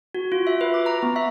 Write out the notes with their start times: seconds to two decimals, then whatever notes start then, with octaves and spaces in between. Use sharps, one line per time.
0.15 F#4
0.32 F4
0.47 E5
0.61 B4
0.74 D6
0.86 A#5
1.03 B3
1.16 E5